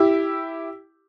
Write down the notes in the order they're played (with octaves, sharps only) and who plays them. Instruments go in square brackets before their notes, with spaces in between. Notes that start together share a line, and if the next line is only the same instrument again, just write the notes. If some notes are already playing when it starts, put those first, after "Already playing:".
Already playing: [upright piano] E4 G4